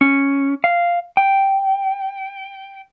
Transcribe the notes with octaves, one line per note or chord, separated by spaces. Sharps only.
C#4
F5
G5